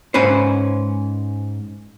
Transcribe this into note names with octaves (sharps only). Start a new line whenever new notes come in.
G#2 C#4 B4 C5